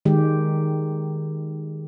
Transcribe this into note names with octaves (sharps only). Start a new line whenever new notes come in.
D#3 G#3 G4